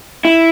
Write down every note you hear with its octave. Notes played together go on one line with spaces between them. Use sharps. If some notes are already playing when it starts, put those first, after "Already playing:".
E4